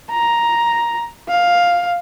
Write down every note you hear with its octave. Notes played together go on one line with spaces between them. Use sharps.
A#5
F5